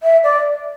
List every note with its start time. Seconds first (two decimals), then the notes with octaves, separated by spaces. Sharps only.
0.03 E5
0.23 D5